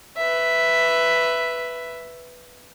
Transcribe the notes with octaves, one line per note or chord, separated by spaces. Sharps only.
B4 E5